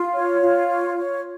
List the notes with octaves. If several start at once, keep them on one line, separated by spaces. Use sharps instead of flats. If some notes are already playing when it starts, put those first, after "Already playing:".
Already playing: F4
C#5
F4
C#5
C#5